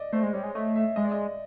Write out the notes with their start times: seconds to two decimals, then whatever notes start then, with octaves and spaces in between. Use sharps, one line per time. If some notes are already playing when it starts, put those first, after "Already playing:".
Already playing: D5 D#5
0.12 A3 C5
0.23 G#3
0.33 G3 C#5
0.43 G#3
0.55 A3 D#5
0.75 E5
0.96 G#3 D#5
1.04 D5
1.12 D#5